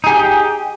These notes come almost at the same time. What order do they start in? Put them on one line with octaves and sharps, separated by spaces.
D#4 G#4 G4 G5